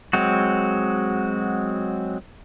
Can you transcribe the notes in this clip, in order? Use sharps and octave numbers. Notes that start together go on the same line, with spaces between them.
F#3 G#3 C4 F#4